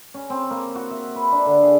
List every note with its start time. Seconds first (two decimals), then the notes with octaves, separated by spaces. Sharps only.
0.14 C#4
0.30 C4
0.51 A#3
0.75 F#4
0.91 E5
1.16 B4
1.32 D4
1.46 D3
1.63 G#4